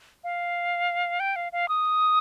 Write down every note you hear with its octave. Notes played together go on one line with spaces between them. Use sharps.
F5
G5
F5
F5
D#6